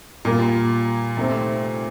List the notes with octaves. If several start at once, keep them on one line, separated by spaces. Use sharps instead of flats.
A#2 G3 A#3 F4
C3 D#3 A3 C4